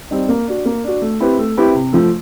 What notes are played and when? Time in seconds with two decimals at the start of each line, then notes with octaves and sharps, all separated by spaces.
0.11 G3 C4 D#4
0.29 A#3
0.47 D4 F#4
0.66 A#3
0.84 D4 F#4
1.02 A3
1.20 C4 E4 G4 B4
1.39 A3
1.57 C4 E4 G4 B4
1.75 C3
1.93 F3 A3